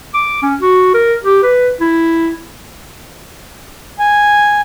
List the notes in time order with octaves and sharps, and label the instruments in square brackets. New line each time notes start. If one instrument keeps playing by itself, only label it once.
[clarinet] D6
C#4
F#4
A#4
G4
B4
E4
[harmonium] G#5